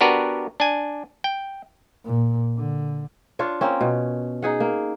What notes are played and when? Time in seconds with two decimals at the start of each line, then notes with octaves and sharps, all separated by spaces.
0.01 B3 D4 F#4 G4 A#4 B4
0.60 D4 G#5
1.24 G5
2.05 A#2
2.57 D3
3.39 D4 F4 C#5
3.61 A#3 C4 C#4
3.81 B2
4.42 D#4 G#4 F#5
4.60 A#3